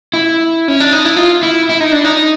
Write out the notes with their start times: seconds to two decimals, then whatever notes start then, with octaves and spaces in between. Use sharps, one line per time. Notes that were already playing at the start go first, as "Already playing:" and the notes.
0.14 E4
0.68 C#4
0.80 D4
0.92 D#4
1.05 E4
1.17 F4
1.43 E4
1.70 E4
1.80 D#4
1.92 D4
2.05 D#4